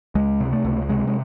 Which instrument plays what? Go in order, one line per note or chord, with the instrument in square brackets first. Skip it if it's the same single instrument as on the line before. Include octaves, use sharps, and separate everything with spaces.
[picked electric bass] C#2 G#3
C3
A3
C#2
C3 G#3
G#3